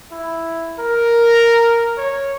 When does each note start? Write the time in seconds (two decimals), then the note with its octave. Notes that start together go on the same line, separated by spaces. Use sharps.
0.12 E4
0.79 A#4
1.97 C#5